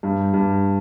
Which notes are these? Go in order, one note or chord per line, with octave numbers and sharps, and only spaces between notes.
G2
G2